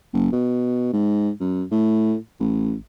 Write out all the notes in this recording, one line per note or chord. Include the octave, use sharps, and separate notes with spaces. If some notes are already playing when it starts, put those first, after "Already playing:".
F#1
B2
G#2
F#2
A2
A1